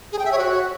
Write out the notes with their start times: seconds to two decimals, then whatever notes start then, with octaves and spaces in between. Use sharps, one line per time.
0.12 G#4
0.19 G5
0.25 E5
0.32 C#5
0.38 F#4